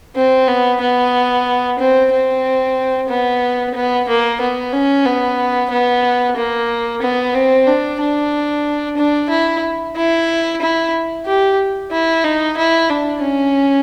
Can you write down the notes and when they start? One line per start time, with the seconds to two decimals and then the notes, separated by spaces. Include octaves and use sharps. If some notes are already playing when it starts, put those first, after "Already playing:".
0.16 C4
0.48 B3
0.81 B3
1.79 C4
2.12 C4
3.09 B3
3.74 B3
4.08 A#3
4.41 B3
4.73 C#4
5.05 B3
5.70 B3
6.36 A#3
7.02 B3
7.34 C4
7.67 D4
8.00 D4
8.97 D4
9.30 E4
9.96 E4
10.61 E4
11.26 G4
11.91 E4
12.24 D#4
12.57 E4
12.90 D4
13.22 C#4